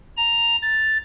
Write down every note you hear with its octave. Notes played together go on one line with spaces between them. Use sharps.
A#5
A6